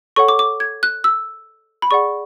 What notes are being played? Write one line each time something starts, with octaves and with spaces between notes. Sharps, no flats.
A4 C#5 F#5 C#6
D6
D6
G#6
F#6
E6
B5
G#4 D5 F#5 C#6